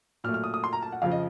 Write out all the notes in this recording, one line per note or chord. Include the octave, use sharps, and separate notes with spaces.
A#2 F#3 A3 F6
F6
D#6
D#6
C6
A#5
A5
F#5
F2 C#3 F3 F5
D#5